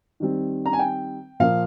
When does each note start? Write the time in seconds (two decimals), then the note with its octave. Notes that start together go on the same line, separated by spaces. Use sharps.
0.20 D#3 G3 C4
0.66 A#5
0.73 G#5
0.79 G5
1.40 A#2 F3 A#3 F5